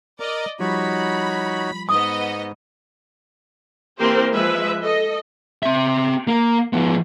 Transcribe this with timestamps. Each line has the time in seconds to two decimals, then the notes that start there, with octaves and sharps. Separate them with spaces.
0.20 A#4 D5 D#5 A#5
0.60 F3 G3 D#4 F#4 C#5 B5
1.89 G#2 B3 D#5 D#6
3.98 E3 A#3 C4 G4 A#4 C5
4.33 F3 G#3 B4 E5
4.81 A4 D#5
5.63 C4 E5
6.27 A#3
6.73 F3 B3